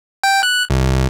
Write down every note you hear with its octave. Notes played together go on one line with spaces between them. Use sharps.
G5
F#6
C2